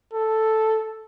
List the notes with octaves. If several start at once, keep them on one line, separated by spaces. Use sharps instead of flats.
A4